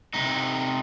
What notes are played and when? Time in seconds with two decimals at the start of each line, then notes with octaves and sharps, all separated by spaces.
0.14 C3 D#4